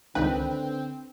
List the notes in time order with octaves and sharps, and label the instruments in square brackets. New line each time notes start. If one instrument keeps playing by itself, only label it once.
[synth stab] C#2 D#3 B4 [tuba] D3 [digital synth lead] C4 [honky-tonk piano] G5